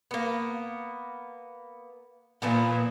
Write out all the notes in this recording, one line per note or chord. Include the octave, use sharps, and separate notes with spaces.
A#3 B3
A#2 E3 F3 B3